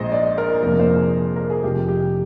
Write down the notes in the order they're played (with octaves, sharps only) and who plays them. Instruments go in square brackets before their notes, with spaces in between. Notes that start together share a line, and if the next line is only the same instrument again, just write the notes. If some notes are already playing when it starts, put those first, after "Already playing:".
Already playing: [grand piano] A#1 A#2 G#3 C5 D#5
D5
A#4
F2 C3 F3 A#3 A#4
C5
G#4
A#4
G#4
F1 F2 C3 F3 G4
G4